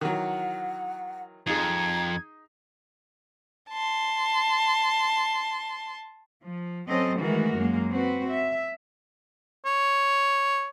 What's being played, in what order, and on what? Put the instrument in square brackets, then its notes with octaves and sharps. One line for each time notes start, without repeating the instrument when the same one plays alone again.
[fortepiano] D#3 E3 F#3 [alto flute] F#5
[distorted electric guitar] F2 [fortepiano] D#4 G#4 [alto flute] A#5 [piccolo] G#6
[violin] A5 C6
[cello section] F3
F#3 C4 C#4 A4 D#5
D#3 E3 G#3 A3 F#4 A#4
F#2 F#3 G#3 A#3
C4 F#4 B4
E5
[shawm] C#5